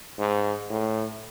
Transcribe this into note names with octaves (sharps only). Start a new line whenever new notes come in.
G#2
A2